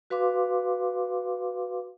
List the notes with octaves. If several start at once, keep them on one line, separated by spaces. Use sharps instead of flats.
F#4 B4 F5 C6 D6